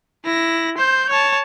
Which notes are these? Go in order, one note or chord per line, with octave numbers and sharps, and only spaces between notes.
E4 A#6
C5 G6
C#5 A5